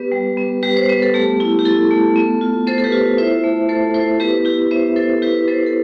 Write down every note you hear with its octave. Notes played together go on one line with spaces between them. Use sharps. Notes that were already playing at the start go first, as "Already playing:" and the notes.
Already playing: B3 G4 B4
G3
B3
G3 G4 B4
C5
B3 B4
A4
A3 G4
E4
G4
E4 A4
A3
B3
F4
B3 A4 C5
A4
G4 B4
F4
E4 C5 E5
A3
A3 A4 C5
E4 A4 C5
B3 G4 B4
E4 G4
B3 C5 E5
E4 A4 C5
E4 G4 B4
B3 A4 C5
A4